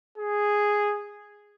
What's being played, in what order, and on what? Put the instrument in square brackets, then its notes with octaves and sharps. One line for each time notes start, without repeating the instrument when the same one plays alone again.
[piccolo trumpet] G#4